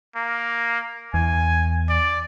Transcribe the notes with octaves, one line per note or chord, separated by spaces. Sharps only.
A#3
E2 G#5
D5